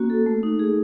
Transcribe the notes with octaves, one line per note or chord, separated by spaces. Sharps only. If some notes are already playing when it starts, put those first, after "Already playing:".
Already playing: A#3 C#4 F#4
A4
A3
D#4
G#4